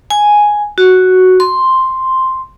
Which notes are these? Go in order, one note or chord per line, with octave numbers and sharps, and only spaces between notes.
G#5
F#4
C6